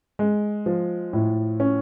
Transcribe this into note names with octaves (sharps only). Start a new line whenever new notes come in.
G#3
F3
A2
C#4